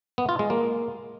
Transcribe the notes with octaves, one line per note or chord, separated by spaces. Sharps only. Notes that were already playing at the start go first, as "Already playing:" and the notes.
B3
F4
G#3
A#3